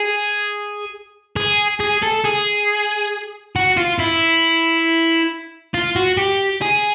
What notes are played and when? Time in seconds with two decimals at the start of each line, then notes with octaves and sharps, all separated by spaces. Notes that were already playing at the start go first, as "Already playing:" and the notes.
Already playing: G#4
1.36 G#4
1.80 G#4
2.02 A4
2.24 G#4
3.56 F#4
3.77 F4
4.00 E4
5.74 F4
5.96 F#4
6.17 G4
6.61 G#4